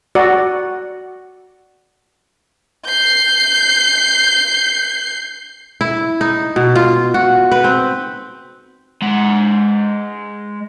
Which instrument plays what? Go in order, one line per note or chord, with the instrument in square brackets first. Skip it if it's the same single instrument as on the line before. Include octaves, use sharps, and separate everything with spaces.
[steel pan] F#4 D5
[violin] G6 C7
[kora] E4
D#4
B2
F4
F#4
B4
C4
[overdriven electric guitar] G#3 F#5